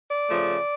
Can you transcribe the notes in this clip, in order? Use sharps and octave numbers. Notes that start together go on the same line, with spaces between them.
D5
C#3 F3 A3